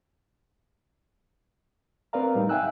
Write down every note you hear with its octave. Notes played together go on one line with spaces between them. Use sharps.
C4 A#4 B4 D5 F5 A#5
A2 G3 D#4
E5 F5 G5 G#5 E6 F#6